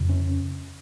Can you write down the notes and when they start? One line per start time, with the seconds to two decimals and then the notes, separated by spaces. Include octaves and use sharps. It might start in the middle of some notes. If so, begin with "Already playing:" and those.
Already playing: F2 C#3
0.09 C#4